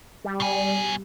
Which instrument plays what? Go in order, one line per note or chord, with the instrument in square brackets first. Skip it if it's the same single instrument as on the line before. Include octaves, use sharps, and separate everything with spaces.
[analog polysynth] G3
[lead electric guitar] B2 G#5